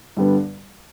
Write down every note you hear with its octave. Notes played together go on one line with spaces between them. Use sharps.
G2 D3 G3 B3